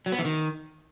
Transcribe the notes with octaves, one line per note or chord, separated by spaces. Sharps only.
F#3
B3
E3
D#3